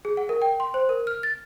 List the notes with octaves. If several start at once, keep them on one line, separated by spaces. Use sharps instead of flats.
G#4
F#5
A#4
G5
C6
C5
A#4
F6
A6